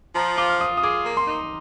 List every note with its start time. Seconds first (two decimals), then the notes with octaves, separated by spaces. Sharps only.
0.14 F3 A#5
0.37 F4 D6
0.49 F6
0.60 F4 D#6
0.77 D#6
0.83 G#4 D6
1.05 A#3
1.17 C6
1.28 D#4